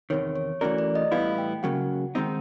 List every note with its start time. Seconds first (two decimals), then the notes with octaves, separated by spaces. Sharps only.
0.10 E2 C3 D#3 C#5
0.36 C#5
0.61 E3 A3 C#4 F#4 A#4 D5
0.78 D5
0.95 D#5
1.12 A2 E3 G3 B3 E4 F5
1.38 G5
1.63 C#2 C#3 F#3 A#3 F#5
2.15 D#3 G#3 C4 D#4